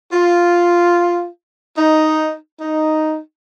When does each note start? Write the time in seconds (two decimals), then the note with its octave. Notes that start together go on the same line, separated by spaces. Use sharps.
0.11 F4
1.77 D#4
2.59 D#4